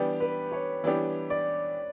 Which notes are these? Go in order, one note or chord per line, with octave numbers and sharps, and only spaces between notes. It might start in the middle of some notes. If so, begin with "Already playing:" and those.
Already playing: E3 G3 B3 D4 G4
B4
C#5
E3 G3 B3 D4 G4
D5